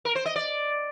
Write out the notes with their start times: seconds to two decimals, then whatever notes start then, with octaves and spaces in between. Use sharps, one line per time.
0.05 A#4
0.15 C5
0.25 D#5
0.36 D5